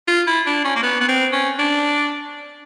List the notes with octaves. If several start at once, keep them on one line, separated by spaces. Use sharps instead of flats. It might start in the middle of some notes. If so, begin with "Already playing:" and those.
F4
E4
D4
C#4
A#3
B3
B3
C4
C#4
D4